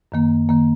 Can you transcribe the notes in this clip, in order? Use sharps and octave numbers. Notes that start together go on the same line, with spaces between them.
F#2 D#3 A#3
D#3 A#3